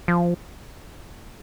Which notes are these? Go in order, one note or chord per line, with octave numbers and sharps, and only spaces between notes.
F3